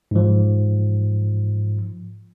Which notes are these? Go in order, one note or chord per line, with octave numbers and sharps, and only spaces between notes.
G#2 F3